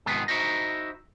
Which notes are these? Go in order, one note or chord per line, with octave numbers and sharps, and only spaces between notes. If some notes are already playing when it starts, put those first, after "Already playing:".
G#2 C3 D#3 F3 B3 G#4
D#4 E4 F#4 C5 D#5